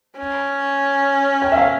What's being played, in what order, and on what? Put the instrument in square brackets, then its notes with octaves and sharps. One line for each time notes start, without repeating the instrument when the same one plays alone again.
[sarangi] C#4
[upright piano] G5
E5
F5